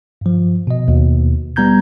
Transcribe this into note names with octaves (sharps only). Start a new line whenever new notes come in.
G2 F3
B2 D#5
D#2 B2
G3 B3 A#5 G6 G#6